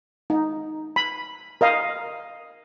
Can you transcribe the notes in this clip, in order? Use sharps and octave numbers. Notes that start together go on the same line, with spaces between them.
D#4
B5
A#4 D#5 F5